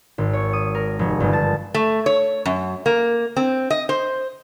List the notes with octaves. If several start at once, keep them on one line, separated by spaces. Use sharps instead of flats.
G#1
C#5
D#6
A#4
F1
G1
A5
A3
C#5
F#2
A#3
C4
D#5
C5